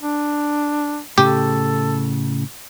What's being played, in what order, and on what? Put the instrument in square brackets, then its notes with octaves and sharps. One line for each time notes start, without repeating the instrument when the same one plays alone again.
[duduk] D4
[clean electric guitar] A2 C#3 [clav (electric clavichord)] G4 [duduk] A4